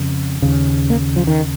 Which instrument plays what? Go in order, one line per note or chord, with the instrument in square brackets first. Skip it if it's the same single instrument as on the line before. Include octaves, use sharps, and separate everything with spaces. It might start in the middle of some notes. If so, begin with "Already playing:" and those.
Already playing: [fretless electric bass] F2 C#3
D#2 C#3
A#3
F3
D#3